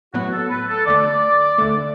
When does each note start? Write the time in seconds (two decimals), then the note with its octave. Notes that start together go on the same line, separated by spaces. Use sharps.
0.14 A1 A2 F#3 B3 F#4
0.32 A4
0.50 B4
0.68 A4
0.86 D2 D3 A3 D5
1.58 D2 D3 A3